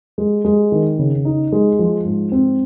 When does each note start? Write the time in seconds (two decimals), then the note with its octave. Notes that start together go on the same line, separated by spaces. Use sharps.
0.18 G#3
0.45 G#3
0.72 D#3
0.99 C#3
1.25 D#4
1.52 G#3
1.79 F3
2.05 G#2
2.32 C4